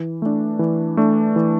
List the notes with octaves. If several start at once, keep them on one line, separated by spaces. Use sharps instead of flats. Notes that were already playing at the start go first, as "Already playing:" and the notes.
Already playing: E3
A3 D4
E3
A3 D4
E3